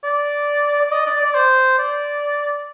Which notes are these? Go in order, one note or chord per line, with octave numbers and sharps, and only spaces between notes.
D5
D5
D#5
D5
D5
C5
D5